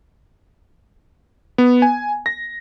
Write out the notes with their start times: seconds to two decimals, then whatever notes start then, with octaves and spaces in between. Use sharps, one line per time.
1.58 B3
1.82 G#5
2.26 A#6